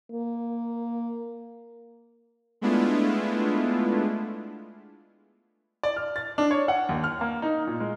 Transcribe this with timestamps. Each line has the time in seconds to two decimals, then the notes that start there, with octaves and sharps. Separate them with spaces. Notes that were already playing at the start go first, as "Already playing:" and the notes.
0.12 A#3
2.61 G#3 A3 B3 D4 E4 F4
5.83 D5
5.96 F6
6.16 A6
6.38 D4
6.51 C#5
6.68 F#5
6.89 D#2
7.04 F6
7.21 A#3
7.42 D#4
7.67 A#2
7.80 G#3